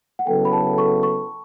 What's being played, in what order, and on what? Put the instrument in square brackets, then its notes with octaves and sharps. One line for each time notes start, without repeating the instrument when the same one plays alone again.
[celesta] F#5
[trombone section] C#3 F#3 B3 E4 A4 [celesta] G5
[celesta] B5
A5
C#6
C#6